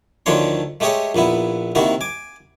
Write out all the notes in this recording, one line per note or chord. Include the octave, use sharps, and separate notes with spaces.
D2 D#3 F3 D4 C#5 C6
G#3 A3 G4 G#4 C#5 D#5
A#1 A#2 B3 E4
C3 D#3 A#3 E4 F#4
G#5 D6